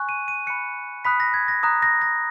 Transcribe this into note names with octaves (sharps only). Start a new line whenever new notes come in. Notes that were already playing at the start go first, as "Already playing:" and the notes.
Already playing: G#5 C#6 F#6
D#7
D#7
B5 F#6 C#7
B5 D#6 F#6 B6
A#6
G#6
A#6
A#5 D#6 F#6 A#6
A#6
A#6